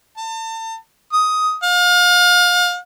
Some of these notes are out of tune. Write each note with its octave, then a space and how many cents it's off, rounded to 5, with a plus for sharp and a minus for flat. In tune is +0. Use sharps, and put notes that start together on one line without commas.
A5 +35
D#6 +10
F5 +35